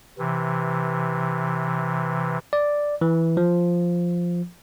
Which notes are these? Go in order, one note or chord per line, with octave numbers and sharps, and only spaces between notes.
C3 E3
D5
E3
F3